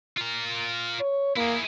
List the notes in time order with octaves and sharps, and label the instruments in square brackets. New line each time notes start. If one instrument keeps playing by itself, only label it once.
[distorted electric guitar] F4 A#4
[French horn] C#5
[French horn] A#3 [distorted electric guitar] E4 G#4